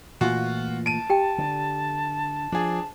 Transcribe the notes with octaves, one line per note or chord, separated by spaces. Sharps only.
A#2 E3 A3 F4 F#4
A5 D7 D#7
G4 G5
D3
F3 D4 G#4